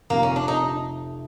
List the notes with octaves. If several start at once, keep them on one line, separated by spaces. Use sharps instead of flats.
F1 F2 C3 A#3
C#4
D4
D#4